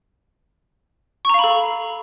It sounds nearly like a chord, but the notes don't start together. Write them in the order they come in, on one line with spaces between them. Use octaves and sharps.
C#6 A#5 F5 B5 A4